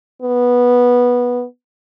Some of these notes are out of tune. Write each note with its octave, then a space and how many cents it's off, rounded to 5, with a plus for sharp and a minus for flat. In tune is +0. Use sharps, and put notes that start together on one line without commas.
B3 -10